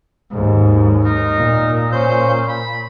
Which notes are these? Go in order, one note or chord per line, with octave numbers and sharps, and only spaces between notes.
D#2 G#2
D#4 A#4
A#2
C#4 C5 G6
B5